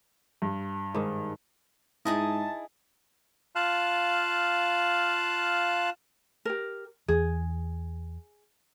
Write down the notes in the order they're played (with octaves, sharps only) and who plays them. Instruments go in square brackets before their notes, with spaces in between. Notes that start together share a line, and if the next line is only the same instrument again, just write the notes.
[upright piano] G2
[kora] G#2 D#3
[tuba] G#2 [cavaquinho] D#4 G#4 D#5 [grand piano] E4 [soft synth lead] A5
[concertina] F4 F5 A5 F#6
[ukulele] G4 A#4
[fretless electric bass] E2 [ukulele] G#4